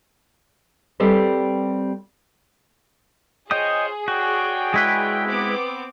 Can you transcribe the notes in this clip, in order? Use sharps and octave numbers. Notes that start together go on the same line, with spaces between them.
G3 C4 G4 A4 B4
F4 G#4 C5 C#5 D#5 G5 D#6
F#4 C#5 D5 G5
G#3 E4 B4
B3 C4 D6